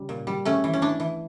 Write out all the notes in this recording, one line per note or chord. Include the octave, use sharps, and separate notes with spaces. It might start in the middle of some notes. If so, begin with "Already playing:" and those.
Already playing: C#3 G3
A#2
G3
A3 C#4
E3
C#4
E3 D4
E3